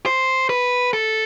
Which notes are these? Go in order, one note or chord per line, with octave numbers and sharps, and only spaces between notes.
C5
B4
A4